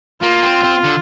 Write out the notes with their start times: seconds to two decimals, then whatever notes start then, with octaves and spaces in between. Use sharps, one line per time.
0.22 A#3 F4
0.42 C4
0.63 C4
0.84 D3